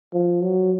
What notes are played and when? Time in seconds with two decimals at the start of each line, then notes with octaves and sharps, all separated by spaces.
0.13 F3
0.42 F#3